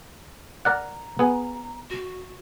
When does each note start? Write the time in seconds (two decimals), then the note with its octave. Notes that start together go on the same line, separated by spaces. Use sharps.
0.65 A#4 D5 F#5 A#5
1.19 B3 G#4
1.90 F#4